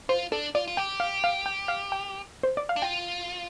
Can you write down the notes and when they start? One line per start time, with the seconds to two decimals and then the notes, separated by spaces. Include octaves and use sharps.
0.09 F4 C5
0.32 D4 A4
0.55 F4 D5
0.68 F4
0.77 G4 G5
1.00 F5
1.24 F5
1.46 G5
1.68 F5
1.92 G5
2.43 C5
2.57 D5
2.69 F5
2.76 D4
2.82 F4 G5